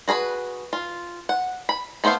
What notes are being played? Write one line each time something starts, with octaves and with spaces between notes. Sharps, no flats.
F#4 G#4 A#4 B4
F4
F#5
B5
A3 B3 C5 E5 F5